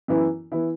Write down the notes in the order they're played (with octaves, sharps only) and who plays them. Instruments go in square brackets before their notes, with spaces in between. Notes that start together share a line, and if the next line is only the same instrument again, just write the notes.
[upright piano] F#2 E3 B3 E4
E3 B3 E4